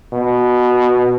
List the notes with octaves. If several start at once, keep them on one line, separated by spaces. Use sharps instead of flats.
B2